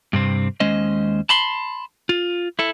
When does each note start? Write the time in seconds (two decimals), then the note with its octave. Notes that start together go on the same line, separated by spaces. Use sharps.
0.13 G2 C3 C4
0.60 D#2 G#3 C#4 C5 D#5
1.29 A5 B5 C6
2.09 F4
2.59 E4 A4